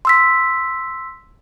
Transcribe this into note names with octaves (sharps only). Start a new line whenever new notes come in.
C6 E6 B6